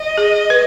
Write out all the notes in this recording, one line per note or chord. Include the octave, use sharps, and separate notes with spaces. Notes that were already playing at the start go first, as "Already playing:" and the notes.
Already playing: D#5
G#4
B4